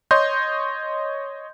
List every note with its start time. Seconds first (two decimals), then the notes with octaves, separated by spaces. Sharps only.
0.11 C#5 D#5 C6 G6